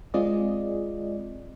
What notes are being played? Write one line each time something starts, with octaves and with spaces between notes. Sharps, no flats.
G#3 C4 F4 G#4 D5 D#5